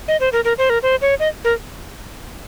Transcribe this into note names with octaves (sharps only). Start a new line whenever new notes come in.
D#5
C5
A#4
A#4
C5
A#4
C5
C#5
D#5
A#4